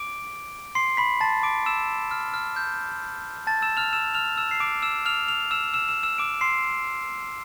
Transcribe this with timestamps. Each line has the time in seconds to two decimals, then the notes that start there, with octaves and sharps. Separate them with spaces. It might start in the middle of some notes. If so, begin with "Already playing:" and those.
Already playing: D6 D7
0.75 C6 C7
0.97 B5 B6
1.21 A5 A6
1.43 D6 D7
1.66 E6 E7
2.11 F6
2.34 F6
2.56 G6
3.47 A5 A6
3.62 E6 E7
3.77 F6 F7
3.93 E6 E7
4.15 F6 F7
4.37 E6 E7
4.51 C7
4.60 D6 D7
4.83 E6 E7
5.06 F6 F7
5.28 F6 F7
5.51 E6 E7
5.74 E6 E7
5.89 E6 E7
6.03 E6 E7
6.18 D6 D7
6.41 C6 C7